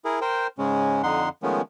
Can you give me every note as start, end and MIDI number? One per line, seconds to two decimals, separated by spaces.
0.05 0.19 64
0.05 0.19 68
0.05 0.19 70
0.21 0.47 70
0.21 0.47 72
0.21 0.47 79
0.58 1.02 44
0.58 1.02 49
0.58 1.02 56
0.58 1.02 61
1.03 1.29 41
1.03 1.29 50
1.03 1.29 63
1.03 1.29 78
1.03 1.29 84
1.43 1.61 51
1.43 1.61 53
1.43 1.61 56
1.43 1.61 57
1.43 1.61 59
1.43 1.61 61